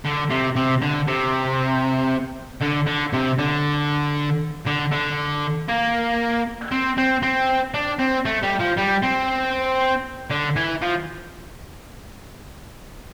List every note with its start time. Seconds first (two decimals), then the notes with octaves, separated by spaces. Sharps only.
0.05 D3
0.30 C3
0.56 C3
0.82 D3
1.08 C3
2.61 D3
2.87 D3
3.13 C3
3.38 D3
4.66 D3
4.92 D3
5.69 A#3
6.72 C4
6.97 C4
7.22 C4
7.74 D4
7.99 C4
8.26 A3
8.43 G3
8.59 F3
8.77 G3
9.02 C4
10.30 D3
10.56 E3
10.82 F3